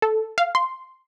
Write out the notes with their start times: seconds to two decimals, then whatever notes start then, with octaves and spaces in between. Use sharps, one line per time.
0.02 A4
0.38 F5
0.55 C6